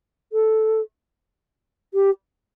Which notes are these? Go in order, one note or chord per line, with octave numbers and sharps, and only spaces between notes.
A4
G4